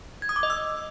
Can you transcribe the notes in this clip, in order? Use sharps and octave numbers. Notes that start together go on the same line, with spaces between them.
G#6
D#6
D6
D#5
E6